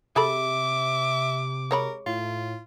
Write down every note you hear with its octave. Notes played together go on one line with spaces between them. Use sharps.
C3 G#4 A4 E5 B5 D6
G#3 A#4 C#5 B5
A2 F4